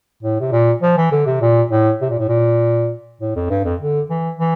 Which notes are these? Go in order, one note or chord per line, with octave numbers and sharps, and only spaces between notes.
A2
C3
A#2
F3
E3
D3
C3
A#2
A2
C3
A#2
A2
A#2
A2
F2
G2
F2
D3
E3
E3